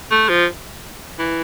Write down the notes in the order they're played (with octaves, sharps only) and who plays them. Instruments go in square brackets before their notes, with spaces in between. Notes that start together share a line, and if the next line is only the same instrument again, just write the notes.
[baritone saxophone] A3
F3
E3